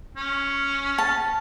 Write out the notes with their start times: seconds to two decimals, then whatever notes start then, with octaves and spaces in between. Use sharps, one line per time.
0.17 C#4
0.98 A5